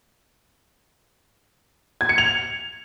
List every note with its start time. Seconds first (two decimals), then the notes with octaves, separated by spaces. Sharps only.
2.01 G#6
2.09 C#7
2.18 F7